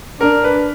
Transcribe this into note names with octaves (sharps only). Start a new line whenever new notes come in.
D4 A#4
B4